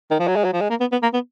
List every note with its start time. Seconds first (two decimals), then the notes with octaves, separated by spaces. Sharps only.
0.11 D#3
0.19 F3
0.27 F#3
0.36 G#3
0.44 F#3
0.53 F3
0.61 G#3
0.70 A#3
0.80 B3
0.92 B3
1.02 A#3
1.14 B3